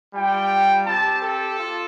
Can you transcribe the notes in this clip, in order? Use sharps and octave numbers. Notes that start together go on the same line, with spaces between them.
G3 F4 G5
C4 G4 A5
A4
F4